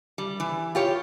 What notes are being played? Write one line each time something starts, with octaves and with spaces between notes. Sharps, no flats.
G3
E3
F4 G4 C#5